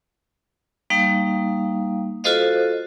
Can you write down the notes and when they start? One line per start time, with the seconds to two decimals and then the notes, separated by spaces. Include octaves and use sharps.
0.90 G3 A#3 D#4 F5
2.24 F4 F#4 A4 C5 D#5 F5